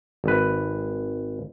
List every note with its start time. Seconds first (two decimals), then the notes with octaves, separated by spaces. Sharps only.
0.24 G#1 B4